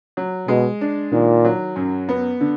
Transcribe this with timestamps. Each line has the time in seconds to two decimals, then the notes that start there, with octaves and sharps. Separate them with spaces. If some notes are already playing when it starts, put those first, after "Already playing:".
0.17 F#3
0.48 B2 G#3
0.81 D4
1.12 A#2 D#3
1.45 F#3
1.76 F#2
2.09 B3
2.41 D3